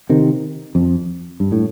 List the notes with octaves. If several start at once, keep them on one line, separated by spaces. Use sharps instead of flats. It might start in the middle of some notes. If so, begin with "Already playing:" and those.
C3 D#3
F2
G2
A2